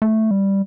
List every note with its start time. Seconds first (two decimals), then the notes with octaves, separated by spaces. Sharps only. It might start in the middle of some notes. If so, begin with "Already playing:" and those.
0.02 A3
0.31 G3